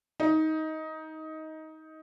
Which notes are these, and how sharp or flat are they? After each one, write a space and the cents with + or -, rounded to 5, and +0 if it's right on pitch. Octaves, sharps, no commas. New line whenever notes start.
D#4 +15